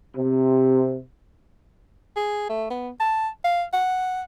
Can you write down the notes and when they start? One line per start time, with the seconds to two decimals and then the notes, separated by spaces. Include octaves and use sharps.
0.17 C3
2.16 G#4
2.49 A3
2.70 B3
3.00 A5
3.44 F5
3.73 F#5